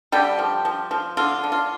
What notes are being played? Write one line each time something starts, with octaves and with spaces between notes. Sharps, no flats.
D3 G3 G4
F3
F3
F3
D3 F4
D3
F4